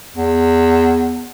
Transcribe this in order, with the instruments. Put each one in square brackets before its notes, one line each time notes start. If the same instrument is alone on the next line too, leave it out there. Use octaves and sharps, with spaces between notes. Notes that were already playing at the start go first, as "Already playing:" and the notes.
[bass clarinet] E2